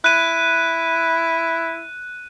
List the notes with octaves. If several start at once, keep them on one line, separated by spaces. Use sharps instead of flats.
E4 F#6 D#7